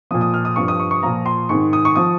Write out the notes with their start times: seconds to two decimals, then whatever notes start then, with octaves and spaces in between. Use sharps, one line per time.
0.11 F3 D#6
0.14 A#2
0.21 D#6
0.34 F6
0.45 D#6
0.56 G2 F3 C#6
0.68 D#6
0.80 C#6
0.91 C#6
1.03 A#2 F3 A#5
1.26 C6
1.49 G#2 D#3 C#6
1.73 D#6
1.85 C#6
1.95 F3 D#6